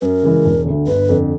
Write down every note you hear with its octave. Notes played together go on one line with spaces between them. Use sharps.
F#2 A#4 B4
C#3 E3 G#3
E1
D2 D3
G1 B4
F2 D3